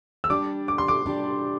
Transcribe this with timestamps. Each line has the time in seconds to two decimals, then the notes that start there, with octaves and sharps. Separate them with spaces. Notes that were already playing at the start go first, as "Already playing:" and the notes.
0.24 E6
0.30 G3 D4 G4 D6
0.68 D6
0.78 C6
0.88 D6
1.06 G3 D4 G4